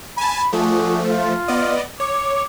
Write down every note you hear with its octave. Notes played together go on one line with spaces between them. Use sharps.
G#5 A5 B5
F3 A3 D4 F#4 G#4
F4
B3 D5 D#5
C#5 D6